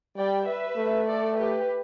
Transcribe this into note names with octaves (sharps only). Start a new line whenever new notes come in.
G3 D5 G5
B4 E5
A3
A4 D5
G4 B4